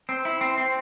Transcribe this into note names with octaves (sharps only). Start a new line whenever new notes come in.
C4
E4
C4
C4